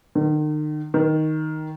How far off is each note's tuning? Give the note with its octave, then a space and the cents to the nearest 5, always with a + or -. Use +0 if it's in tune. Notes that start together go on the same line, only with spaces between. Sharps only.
D#3 -40
D#3 +5